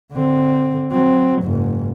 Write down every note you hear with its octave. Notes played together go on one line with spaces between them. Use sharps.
D3 C4
F#3 C4
F#1 G#2